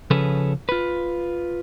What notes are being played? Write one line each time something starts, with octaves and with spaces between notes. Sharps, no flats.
C#3 F3 C#4 G#4 A4 B4
F4 B4